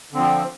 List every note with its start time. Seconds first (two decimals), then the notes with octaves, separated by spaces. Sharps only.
0.12 D3
0.15 C4
0.17 F3